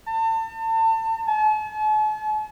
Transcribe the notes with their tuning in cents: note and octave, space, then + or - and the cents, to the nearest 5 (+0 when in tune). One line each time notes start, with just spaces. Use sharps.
A5 +35
A5 -45